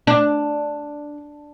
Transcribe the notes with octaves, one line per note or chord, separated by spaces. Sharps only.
D4